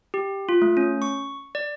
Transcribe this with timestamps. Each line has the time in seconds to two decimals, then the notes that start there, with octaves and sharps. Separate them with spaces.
0.14 G4
0.49 F4
0.62 A3
0.77 C#4
1.02 C#6
1.55 D5